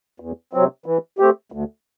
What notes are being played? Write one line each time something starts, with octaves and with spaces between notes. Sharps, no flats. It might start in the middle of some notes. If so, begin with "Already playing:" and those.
E2
C3 F#3 C4
E3
A3 C4 G4
D2